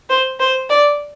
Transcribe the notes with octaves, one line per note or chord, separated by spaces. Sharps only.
C5
C5
D5